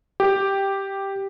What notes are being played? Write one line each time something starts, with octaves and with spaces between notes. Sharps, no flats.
G4